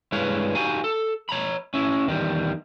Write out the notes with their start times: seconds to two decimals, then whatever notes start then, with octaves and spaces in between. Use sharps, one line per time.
0.12 G2 G#3 E4 B4 C#5 F5
0.55 D#4 F#4 G4 F5 G#5
0.84 A4
1.29 C#5 A#5 B5
1.74 C#4 E4
2.07 E2 D#3 G3